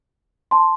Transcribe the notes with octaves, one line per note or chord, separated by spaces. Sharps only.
A5 C6